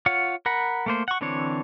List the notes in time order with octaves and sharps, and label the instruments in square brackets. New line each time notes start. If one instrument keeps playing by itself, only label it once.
[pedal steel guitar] F4 C#5 F#5
A#4 F#5 B5
A3 A#3 C5
F#5 C#6
D3 E3 C4 D4 C#5